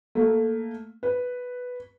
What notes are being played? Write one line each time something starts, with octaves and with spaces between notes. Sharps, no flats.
A3 A#3
B4